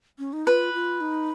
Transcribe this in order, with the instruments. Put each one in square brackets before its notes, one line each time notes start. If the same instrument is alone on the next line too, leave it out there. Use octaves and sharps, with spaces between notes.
[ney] C#4
D#4
[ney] F4 [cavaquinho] B4
[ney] F4
D#4